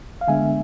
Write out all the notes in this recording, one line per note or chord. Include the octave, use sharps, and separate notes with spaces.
F5
D3 G#3 B3 D4 E5 G#5